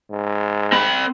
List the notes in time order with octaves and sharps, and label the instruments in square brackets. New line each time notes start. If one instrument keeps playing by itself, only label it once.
[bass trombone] G#2
[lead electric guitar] C4 B5